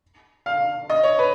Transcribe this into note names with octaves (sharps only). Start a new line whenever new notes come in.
F5
D#5
C#5
B4